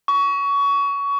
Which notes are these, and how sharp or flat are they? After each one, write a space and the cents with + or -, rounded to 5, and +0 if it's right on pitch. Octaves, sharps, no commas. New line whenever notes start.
C#6 +25